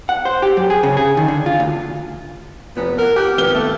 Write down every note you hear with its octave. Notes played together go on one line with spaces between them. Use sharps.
F#5
C5
G4
F#2
G#4
C#3
G#4
D#3
D3
F4
D2
F1 B3
A#4 F#5
G4 G5 F#6
G#1 B3 F6 G7
A3